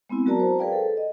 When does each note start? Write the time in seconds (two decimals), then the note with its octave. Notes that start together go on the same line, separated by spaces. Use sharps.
0.09 G#3 B3 C4 E4
0.26 F#3 F#4 A#4 D5 A5 A#5
0.40 C5
0.59 G#4 A#4 B4 D5 F5 G5
0.73 A4
0.97 D#5